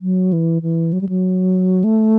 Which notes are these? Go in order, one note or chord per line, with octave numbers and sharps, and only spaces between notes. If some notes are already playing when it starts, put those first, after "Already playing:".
F#3
E3
E3
F#3
G3
F#3
A3